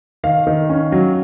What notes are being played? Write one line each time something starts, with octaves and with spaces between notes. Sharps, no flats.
D#3 F5
D#3
C#4
F#3